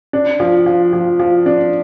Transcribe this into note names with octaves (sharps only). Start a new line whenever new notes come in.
D4
F3
F3
F3
F3
D4